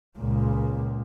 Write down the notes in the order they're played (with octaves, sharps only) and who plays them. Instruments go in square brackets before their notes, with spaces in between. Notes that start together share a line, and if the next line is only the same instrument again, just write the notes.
[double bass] C#2 A#2